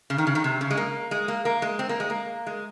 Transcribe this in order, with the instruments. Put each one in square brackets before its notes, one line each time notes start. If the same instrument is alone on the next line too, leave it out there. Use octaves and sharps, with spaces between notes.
[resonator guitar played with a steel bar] C#3
D#3
C#3
D#3
C3
C#3
G#3
A#3
G#3
A#3
A#3
G#3
C4
A#3
G#3
A#3
G#3